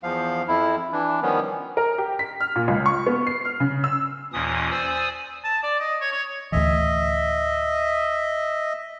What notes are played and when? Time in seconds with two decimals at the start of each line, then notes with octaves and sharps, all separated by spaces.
0.03 E2 F3 F5
0.48 F2 E4
0.92 E3 D4
1.22 D#3 F3 G3 B3 C#4
1.77 A#4
1.98 G4
2.19 B6
2.40 F6
2.56 A#2
2.68 C#2
2.86 C#6
3.07 B3
3.27 C7
3.45 F6
3.60 C#3
3.84 E6
4.33 D#2 A#2 E3 C#4 D#6
4.71 C5 D5 G#5 D#6 E6
5.44 A5
5.63 D5
5.79 D#5
6.01 C#5
6.12 C#5
6.52 D2 A2 E3 D#5 E5